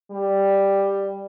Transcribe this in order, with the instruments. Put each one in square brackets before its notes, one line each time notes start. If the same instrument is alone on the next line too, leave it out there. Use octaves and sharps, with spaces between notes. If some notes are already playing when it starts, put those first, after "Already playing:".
[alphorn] G3